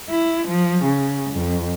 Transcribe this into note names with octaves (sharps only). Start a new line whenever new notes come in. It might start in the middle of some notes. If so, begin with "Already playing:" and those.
E4
F3
C#3
F2